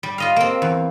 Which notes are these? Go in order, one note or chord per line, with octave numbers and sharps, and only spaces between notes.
G3
F4 D#5 F5
A#3 C4
E2